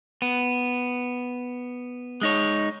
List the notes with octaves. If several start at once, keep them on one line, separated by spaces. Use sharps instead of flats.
B3
G#3 D#4 C#5